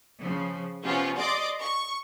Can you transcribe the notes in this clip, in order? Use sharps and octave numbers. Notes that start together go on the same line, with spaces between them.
C#3 F3
C3 F3 B3 C#4 F4
D5 D#5 C6 D6 D#6
C#6